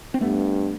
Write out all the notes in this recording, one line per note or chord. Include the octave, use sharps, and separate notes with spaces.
C4
G2 A3 B3